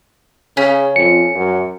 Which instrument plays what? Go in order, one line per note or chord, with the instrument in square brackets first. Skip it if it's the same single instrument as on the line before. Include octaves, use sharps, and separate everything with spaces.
[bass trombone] C#3 [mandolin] C#4
[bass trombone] F2 [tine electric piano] C#7
[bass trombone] F#2